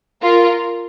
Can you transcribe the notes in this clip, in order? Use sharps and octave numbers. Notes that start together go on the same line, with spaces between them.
F4 A#4